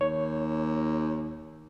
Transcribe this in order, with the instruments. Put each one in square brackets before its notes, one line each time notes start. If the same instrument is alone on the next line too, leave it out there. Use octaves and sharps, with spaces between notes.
[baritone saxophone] D#2 [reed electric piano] C#5